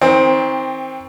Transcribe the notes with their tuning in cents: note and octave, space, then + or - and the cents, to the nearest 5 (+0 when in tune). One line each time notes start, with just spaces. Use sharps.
D#3 +40 C4 +10